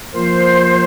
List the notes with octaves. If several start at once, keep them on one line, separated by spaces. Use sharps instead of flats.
F3 A#3 F4 A#4 C5